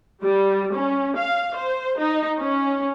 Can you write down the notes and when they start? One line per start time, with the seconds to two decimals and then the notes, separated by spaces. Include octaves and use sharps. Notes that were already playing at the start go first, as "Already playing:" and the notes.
0.23 G3
0.74 C#4
1.18 F5
1.56 C5
1.99 D#4
2.40 C#4